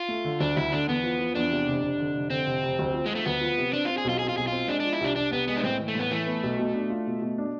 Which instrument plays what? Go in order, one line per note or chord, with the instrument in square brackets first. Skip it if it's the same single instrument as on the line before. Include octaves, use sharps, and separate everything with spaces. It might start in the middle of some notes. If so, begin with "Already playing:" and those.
Already playing: [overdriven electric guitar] F4
[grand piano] A3
D3
[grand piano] D2 [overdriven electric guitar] D4
[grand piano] D2 [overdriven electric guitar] E4
[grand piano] D3 [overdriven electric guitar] D4
[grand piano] E2 [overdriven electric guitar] B3
[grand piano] F3
F3
[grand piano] E2 [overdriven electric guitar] D4
[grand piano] C3
F1
F1
D3
F1
[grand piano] D3 [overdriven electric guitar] C4
[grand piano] F1
F1
D2
F3
[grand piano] F3 [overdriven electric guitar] G#3
[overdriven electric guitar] A3
[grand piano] D2 [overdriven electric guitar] B3
[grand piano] F3
C3
[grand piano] C4 [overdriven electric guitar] D4
[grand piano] C4 [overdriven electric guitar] F4
[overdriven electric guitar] G#4
[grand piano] B1 [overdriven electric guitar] F4
[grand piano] C4 [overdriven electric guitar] G#4
[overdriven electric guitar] F4
[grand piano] B1 [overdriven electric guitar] G#4
[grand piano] C4 [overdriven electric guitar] F4
[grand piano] G#3 [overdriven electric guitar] D4
[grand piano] F3 [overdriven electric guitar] D4
[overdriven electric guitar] E4
[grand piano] C2 [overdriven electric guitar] D4
[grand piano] C2 [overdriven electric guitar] D4
[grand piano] C2 [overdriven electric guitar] B3
[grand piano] G#3 [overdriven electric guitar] B3
[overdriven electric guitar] D4
[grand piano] A2 [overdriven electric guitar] C4
[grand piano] E3
[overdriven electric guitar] A3
[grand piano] A2 [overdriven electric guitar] B3
[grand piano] E3 [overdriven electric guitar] A3
[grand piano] B3
B1
B2
D4
F4
B2
B2
D4